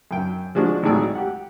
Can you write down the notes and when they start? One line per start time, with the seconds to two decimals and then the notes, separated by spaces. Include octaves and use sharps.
0.11 F#2 G5
0.55 F3 G#3 D4 F#4
0.83 G#1 A2 F#3 G#4 D5 E6
1.15 G4 F#5